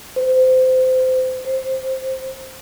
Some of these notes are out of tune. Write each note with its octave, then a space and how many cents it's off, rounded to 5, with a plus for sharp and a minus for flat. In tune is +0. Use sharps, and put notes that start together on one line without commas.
C5 -25
C5 +5